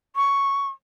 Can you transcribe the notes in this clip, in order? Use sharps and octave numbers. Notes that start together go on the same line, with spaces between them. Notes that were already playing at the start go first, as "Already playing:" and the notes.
C#6